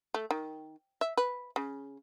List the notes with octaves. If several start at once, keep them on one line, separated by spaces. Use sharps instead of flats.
A3
D#3
E5
B4
C#3